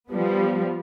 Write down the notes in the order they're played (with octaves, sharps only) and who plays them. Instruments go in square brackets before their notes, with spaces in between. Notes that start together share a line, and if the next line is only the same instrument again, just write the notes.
[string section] F3 G3 B3